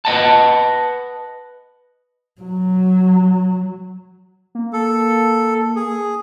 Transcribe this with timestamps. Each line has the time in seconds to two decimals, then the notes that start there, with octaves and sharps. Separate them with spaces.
0.05 B4 D#5 F#5 A5
2.41 F#3
4.55 A#3
4.73 A4
5.76 G#4